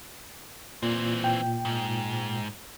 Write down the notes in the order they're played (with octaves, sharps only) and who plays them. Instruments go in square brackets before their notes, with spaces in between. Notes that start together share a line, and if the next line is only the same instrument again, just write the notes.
[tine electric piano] A#2 [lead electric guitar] E3 C4
[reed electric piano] G5
[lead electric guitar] G#2